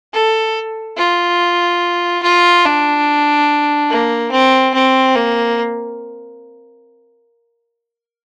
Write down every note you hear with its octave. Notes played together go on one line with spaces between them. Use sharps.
A4
F4
F4
D4
A#3
C4
C4
A#3